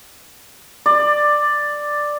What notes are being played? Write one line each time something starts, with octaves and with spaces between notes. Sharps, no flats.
D5